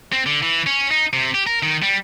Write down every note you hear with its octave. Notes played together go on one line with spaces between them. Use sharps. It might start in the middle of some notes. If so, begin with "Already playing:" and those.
C4
D3
E3
C#4
D#4
C3
G4
A#4
D#3
G3